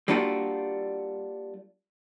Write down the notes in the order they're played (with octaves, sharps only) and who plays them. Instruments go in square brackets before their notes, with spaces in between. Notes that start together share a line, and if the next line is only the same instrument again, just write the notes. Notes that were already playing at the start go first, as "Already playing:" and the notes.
[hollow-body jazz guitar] G3 A#3 D4 F4 F#4